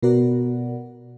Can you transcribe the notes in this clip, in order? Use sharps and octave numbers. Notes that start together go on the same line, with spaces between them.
B2 B3 F#4 A#4 D5 F#5